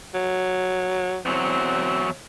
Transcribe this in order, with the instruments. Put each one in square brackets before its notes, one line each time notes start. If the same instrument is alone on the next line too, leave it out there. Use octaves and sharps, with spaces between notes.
[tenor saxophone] F#3
[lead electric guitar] E2 F#3 [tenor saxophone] C4